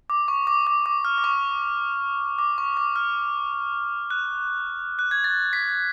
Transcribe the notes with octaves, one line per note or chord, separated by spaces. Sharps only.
D6
C#6
D6
D6
D6
F6
D6
C#6
D6
C#6
D6
F6
F#6
F#6
G#6
A6
B6